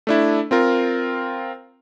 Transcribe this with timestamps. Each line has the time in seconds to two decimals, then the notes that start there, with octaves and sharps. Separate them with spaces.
0.07 A3 D4 E4
0.51 C4 F4 A#4